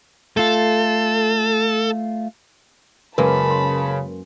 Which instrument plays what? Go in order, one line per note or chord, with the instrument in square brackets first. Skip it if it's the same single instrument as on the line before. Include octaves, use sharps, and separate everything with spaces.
[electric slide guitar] A3 F4 [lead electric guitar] A4
[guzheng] F#2 G#3 A#3 [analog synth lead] C#3 [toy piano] A#4 B4 [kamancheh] A5 B5
[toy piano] C6